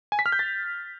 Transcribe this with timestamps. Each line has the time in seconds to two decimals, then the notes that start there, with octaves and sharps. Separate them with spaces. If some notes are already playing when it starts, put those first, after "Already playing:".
0.12 G#5
0.19 B6
0.26 F6
0.32 G6
0.39 A6